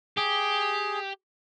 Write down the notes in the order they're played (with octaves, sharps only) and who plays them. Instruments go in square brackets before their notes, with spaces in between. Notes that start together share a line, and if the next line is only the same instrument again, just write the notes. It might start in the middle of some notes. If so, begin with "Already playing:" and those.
[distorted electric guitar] G4 [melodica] G#4